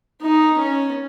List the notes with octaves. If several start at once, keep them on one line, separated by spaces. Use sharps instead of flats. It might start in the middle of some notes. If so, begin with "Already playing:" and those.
D#4
C#4